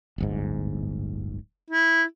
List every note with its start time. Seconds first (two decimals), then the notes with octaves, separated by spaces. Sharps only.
0.18 D1 G1 G#2
1.70 E4